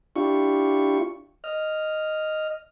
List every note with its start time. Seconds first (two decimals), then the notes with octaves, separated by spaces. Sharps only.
0.16 D4 E4 F4 G4 C#6
1.44 D#5 F6